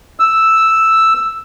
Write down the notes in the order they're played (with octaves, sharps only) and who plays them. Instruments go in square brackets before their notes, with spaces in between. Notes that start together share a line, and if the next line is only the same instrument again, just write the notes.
[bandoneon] E6